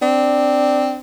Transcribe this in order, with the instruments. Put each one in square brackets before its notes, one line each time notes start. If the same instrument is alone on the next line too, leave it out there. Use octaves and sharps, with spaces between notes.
[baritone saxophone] C4 [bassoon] D4